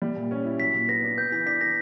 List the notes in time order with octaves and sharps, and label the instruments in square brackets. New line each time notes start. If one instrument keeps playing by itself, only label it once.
[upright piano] G3
A#2
C#4
E4
[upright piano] F#3 [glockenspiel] B6
[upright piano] A#2
[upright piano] B3 [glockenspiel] A#6
[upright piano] D4
[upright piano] B3 [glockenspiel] G6
[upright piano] E3 [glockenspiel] B6
[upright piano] D4 [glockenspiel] B6
[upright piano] E3 [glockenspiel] A#6